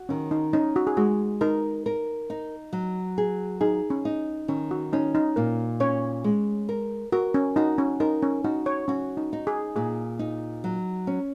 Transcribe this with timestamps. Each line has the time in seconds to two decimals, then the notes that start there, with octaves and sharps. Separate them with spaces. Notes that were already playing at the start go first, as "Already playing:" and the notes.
Already playing: F#4
0.09 D#3 C#4
0.31 D#4
0.53 C#4 D#4
0.76 F#4
0.87 G#4
0.97 G#3 F#4
1.41 D#4 A#4
1.86 A#4
2.30 D#4
2.73 F#3
3.18 G#4
3.61 D#4 G#4
3.90 C#4
4.05 D#4
4.48 D#3 C#4
4.71 F#4
4.93 C#4 D#4
5.15 D#4
5.36 A#2 A#4
5.80 C#4 C#5
6.24 G#3
6.69 A#4
7.12 F#4 A#4
7.34 C#4
7.56 D#4 F#4
7.78 C#4
8.00 D#4 A#4
8.22 C#4
8.44 D#4 F#4
8.66 C#5
8.88 C#4 F#4
9.17 D#4
9.33 D#4
9.47 G#4
9.76 A#2 G#4
10.19 D#4
10.64 F#3
11.07 C#4